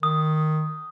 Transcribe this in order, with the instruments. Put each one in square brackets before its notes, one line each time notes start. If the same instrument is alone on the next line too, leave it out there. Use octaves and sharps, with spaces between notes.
[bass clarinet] D#3 [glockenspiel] D#6